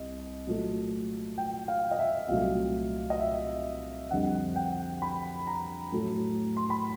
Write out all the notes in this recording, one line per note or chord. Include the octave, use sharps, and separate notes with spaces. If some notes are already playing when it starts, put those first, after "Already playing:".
Already playing: C2 D#5
A#2 F#3 A3
G5
F5
D#5
E5
C2 A#2 F#3 A3 F5
D#5
E5
F2 D3 G3 F#5
G5
B5
A#5
A2 F#3 A3
C6
B5